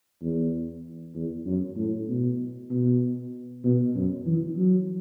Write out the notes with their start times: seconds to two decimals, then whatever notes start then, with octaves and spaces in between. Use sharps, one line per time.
0.21 E2
1.15 E2
1.46 F#2
1.77 A2
2.08 B2
2.70 B2
3.64 B2
3.95 F#2
4.26 E3
4.57 F#3